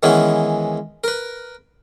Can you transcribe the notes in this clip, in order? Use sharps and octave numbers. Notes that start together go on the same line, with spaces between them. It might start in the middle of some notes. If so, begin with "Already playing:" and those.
D#3 E3 G#3 B3 C#4 E4
A#4 B4